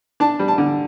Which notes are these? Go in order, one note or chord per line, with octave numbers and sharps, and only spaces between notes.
D4 A5
G3
A5
D3